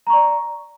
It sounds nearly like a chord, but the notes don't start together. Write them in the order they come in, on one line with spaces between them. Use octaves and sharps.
A#5 C#6 D5